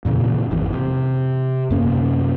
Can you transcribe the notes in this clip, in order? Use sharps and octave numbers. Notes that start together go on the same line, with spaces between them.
F2 A#2 C#3 E3
G#1 F2 E3
C3
F#2 C3 A#3 C#4